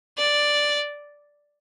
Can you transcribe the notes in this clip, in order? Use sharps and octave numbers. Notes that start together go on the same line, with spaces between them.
D5